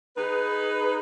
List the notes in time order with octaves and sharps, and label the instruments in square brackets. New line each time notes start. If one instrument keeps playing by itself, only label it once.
[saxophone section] D#4 G#4 B4